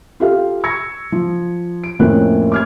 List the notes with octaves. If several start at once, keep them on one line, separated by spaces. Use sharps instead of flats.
F4 G4 A4 F5
C#6 E6 G#6 A#6 C#7
F3
D7
F2 A2 A3 A#3 C#4 F#6
D6 F6 G#6